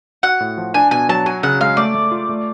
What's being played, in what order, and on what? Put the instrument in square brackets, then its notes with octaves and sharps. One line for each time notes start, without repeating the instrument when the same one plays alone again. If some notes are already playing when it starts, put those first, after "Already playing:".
[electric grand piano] F#4 [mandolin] F#5
[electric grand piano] A2
F3
[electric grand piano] D4 [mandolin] G#5
[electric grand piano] B2 [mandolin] G#5
[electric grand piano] F#3 [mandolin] A5
[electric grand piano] F#4 [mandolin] G#5
[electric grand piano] C#3 [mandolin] F#5
[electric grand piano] G#3 [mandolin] F5
[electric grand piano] A3 [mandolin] D5
[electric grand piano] A3
F4
A3